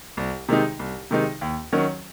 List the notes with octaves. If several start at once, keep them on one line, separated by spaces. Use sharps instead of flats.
C2
C3 D#3 G#3 D#4
C2
C3 D#3 G#3 D#4
D#2
D#3 F#3 C#4 F#4